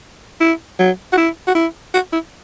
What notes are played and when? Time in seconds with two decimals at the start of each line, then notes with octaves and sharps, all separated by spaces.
0.41 E4
0.79 F#3
1.13 F#4
1.17 E4
1.47 F#4
1.55 E4
1.94 F#4
2.13 E4